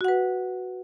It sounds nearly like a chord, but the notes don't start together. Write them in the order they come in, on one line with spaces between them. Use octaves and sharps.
F#4 F#5 B4